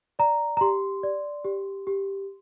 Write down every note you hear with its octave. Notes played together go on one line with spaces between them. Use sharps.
D5 A#5
A#5
G4 C6
D5
G4
G4